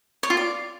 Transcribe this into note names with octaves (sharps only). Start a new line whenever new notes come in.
C#5
F4
D5